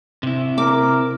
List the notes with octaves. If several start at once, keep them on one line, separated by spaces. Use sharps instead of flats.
C3 E4
A#4 D6